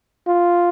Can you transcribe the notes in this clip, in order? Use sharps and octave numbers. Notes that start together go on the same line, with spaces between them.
F4